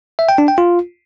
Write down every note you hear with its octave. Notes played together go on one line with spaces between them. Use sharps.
E5
G5
D4
G5
F4